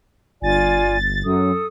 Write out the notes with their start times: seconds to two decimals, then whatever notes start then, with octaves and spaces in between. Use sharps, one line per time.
0.42 G1 F4 D5 G#5 A6
1.25 F#2 A4 D#6